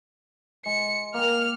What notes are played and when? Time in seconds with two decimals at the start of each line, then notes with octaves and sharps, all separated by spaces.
0.66 G#3 C#7
1.14 A#3 G5 F6 F7